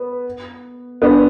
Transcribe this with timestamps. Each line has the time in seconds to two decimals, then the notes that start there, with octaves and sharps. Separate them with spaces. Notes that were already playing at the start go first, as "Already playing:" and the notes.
Already playing: B3
1.02 B3 D4